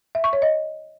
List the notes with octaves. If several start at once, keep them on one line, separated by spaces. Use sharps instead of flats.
E5
C#6
C#5
D#5